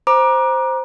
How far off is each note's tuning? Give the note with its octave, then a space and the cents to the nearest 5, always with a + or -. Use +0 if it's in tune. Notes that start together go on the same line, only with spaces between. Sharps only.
C5 +0 A#5 +30 D6 +15